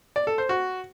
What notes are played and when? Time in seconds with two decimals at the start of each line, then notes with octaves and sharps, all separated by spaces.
0.16 D5
0.27 A4
0.38 C5
0.49 F#4